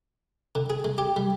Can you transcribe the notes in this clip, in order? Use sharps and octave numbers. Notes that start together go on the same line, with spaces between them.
D3
G#4
G#3
G4
G3